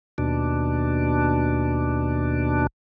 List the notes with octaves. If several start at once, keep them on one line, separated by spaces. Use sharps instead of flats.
D#2 B2 D4